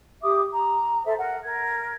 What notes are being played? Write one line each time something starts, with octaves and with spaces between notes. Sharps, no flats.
G4 E5 D6 D#6
A#5
A4 C5 E5
A#4 F#5
A#4 G#6